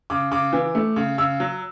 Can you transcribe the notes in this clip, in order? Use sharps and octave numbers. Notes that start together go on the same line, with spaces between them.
C#3 D6
C#3 D6
E3
A3
C#3
C#3 E6
F#3